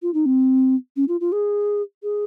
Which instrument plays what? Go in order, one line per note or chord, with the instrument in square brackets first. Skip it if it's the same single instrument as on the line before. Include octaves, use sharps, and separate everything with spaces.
[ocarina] F4
D#4
C4
C#4
F4
F4
G#4
G#4